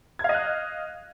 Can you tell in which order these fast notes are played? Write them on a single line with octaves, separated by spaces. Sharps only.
G#6 F5 D#5 F#6